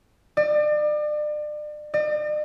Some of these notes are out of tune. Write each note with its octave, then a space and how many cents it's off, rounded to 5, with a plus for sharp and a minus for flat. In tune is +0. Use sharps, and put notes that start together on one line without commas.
D5 +35
D5 +45